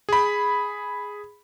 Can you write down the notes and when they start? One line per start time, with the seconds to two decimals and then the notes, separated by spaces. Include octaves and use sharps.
0.09 G#4 B5